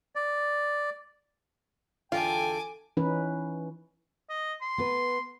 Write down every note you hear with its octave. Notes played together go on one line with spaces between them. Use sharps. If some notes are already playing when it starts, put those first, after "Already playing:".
D5
E2 D3 F4 G5 G#5 D6
E3 C#4 D#4 B4
D#5
C6
B3 B4